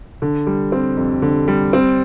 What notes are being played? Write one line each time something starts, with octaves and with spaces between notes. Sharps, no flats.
D3
G3
C4
F2
D3
G3
C4